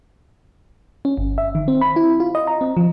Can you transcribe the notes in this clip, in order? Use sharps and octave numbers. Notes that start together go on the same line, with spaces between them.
C#4
G1
E5
D#3
C4
B5
E4
F4
D#5
A#5
C4
F3